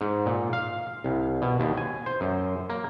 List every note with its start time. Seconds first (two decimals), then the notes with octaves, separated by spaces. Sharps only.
0.01 G#2
0.26 A#2
0.53 F5
1.04 C2
1.42 B2
1.60 D#2
1.77 G#5
2.06 C5
2.21 F#2
2.70 A#3